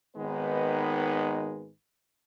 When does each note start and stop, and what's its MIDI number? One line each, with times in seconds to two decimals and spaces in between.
0.17 1.70 32
0.17 1.70 51
0.17 1.70 56
0.17 1.70 59
0.17 1.70 63
0.17 1.70 71